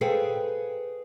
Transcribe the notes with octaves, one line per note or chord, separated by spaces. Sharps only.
G#4 A4 B4 C5 F5 G5